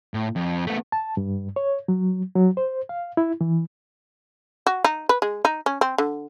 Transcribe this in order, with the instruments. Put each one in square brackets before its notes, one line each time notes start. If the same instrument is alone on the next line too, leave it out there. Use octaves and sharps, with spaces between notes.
[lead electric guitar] A2
F2
A3 B3
[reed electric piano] A5
G2
C#5
F#3
F#3
C5
F5
E4
E3
[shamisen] F#4
D#4
B4
G#3
D#4
C#4
C4
D3